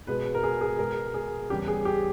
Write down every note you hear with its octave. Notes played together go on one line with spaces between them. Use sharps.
B2 G#3 B3 B4
A#4
G#4
G#4
B2 G#3 B3 A#4
G#4
E2 C#3 G3 C#4 G4
G#4
G4